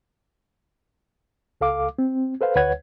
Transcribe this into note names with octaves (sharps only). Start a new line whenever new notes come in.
C#2 A4 F5 D6
C4
A4 B4 C5 F5
D2 B4 C#5 F#5 G#6